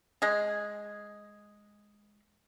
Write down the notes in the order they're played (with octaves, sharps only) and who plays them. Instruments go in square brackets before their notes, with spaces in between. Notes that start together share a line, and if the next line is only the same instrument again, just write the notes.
[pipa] G#3 G#4